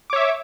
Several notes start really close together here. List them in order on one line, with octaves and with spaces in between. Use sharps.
D6 C#5 E5